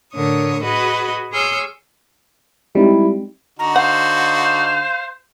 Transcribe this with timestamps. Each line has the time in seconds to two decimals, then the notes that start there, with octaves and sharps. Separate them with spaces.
0.13 A2 D3 A#4 C#5 D#6
0.62 F#4 G#4 B4 D#5
1.31 G#4 C#5 C6 E6 F6 G6
2.75 G3 G#3 C4 D#4 E4
3.59 D3 D#4 F#4 A#5
3.76 C5 F5 F#5